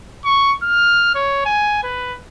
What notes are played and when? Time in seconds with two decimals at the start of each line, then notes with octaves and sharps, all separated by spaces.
0.24 C#6
0.63 F6
1.15 C#5
1.45 G#5
1.83 B4